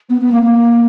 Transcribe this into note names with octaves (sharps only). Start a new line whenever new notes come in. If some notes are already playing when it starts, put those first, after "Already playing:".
B3
B3
A#3
A#3